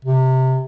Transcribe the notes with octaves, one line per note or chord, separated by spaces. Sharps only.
C3